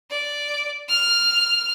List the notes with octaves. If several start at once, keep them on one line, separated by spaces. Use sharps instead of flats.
D5
F6